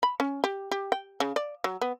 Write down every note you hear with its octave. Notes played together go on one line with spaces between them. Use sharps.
B5
C#4
G4
G4
G5
C#3
D5
F#3
B3